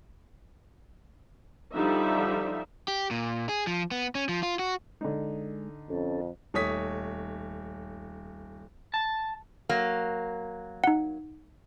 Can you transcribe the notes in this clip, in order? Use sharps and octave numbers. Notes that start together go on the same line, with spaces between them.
D3 F3 G3 D#4 E5
G4
A#2
G#4
F3
B3
C#4
F3
F4
F#4
D3 G#3 D#4
F2 C#4 A4
D#1 A3 C#5 D#6 B6
A5
F#3 A#3
D#4 F#5